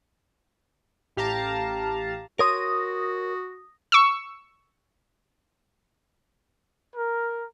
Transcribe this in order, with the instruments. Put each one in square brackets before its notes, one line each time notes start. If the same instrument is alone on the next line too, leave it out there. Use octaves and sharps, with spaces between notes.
[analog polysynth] A1 G4 F5 A5 A#5
[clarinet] F#4 [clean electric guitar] A#4 C#5 C6 [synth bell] D#6 A#6
[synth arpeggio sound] C#6 E6
[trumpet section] A#4